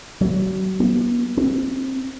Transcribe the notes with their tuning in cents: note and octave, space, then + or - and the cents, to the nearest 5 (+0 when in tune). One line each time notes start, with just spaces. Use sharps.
F#3 +35
B3 -45
C4 +25